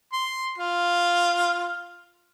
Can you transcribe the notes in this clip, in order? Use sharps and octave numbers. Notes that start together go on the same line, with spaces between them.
C6
F4